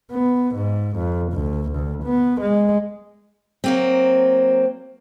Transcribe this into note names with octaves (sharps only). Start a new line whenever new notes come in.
B3
G#2
F2
D2
D2
B3
G#3
F#3 A#3 C4